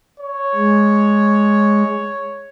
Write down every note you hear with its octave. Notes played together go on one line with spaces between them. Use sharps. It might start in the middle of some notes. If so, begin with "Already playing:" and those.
C#5
G#3